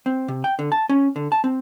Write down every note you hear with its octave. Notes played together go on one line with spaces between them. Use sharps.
C4
C3
G5
D3
A5
C#4
D3
A5
C4